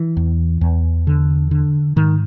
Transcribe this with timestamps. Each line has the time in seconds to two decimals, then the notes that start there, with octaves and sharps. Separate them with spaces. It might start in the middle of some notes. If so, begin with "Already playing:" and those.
Already playing: E3
0.17 E2
0.61 E2
1.07 D3
1.51 D3
1.96 G#2 D#3